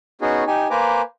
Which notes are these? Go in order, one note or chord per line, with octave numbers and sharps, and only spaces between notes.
B3 C#4 D#4 F#4 G#4
D#4 G4 G#5
A#3 B4 C5 G#5 A#5 D6